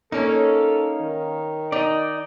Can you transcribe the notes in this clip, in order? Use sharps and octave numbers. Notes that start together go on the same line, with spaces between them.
A#3 C#4 D#4 A4 C#5
D#3
D#4 D5 D#5